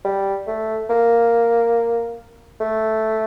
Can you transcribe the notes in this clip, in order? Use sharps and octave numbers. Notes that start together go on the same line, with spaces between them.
G3
A3
A#3
A3